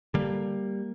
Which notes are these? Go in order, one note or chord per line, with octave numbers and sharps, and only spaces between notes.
D3 G3 A#3